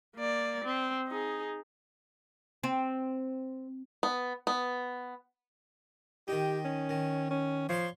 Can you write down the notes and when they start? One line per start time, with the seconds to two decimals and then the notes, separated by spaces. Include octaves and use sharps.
0.16 A#3 D5
0.64 C4
1.08 D#4 G#4
2.63 C4
4.03 B3
4.47 B3
6.28 D#3 D#4 G4
6.64 C#4
6.89 D#3
7.30 C#4
7.69 F3 C#5 F5 C6